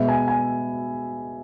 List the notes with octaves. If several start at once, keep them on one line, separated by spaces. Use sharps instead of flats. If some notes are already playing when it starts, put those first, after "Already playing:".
Already playing: B2 G#3 B3 E5
G#5
G#5